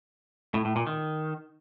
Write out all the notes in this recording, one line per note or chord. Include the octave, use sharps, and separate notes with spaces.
A2
A2
A#2
D#3